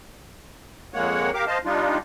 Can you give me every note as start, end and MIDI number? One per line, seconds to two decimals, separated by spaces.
0.94 1.31 41
0.94 1.31 56
0.94 1.31 58
0.94 1.31 73
0.94 1.31 78
1.34 1.45 67
1.34 1.45 70
1.34 1.45 77
1.34 1.45 86
1.47 1.58 72
1.47 1.58 75
1.47 1.58 77
1.47 1.58 81
1.65 1.98 55
1.65 1.98 62
1.65 1.98 63
1.65 1.98 65